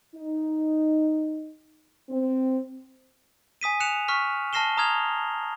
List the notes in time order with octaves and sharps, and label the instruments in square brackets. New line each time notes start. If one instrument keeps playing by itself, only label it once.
[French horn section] D#4
C4
[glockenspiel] G#5 D#6 B6 D#7
F#6 C#7 E7 F7
C#6 F6 B6
A5 F6 A#6 C7 E7 G7
A#5 D#6 F6 G#6 F7